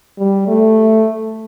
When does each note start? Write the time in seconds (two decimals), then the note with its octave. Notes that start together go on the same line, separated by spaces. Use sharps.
0.18 G3
0.48 A3